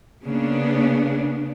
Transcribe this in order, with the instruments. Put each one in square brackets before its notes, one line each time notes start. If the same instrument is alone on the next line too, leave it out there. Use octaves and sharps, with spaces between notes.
[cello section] C#3 A#3 B3 D4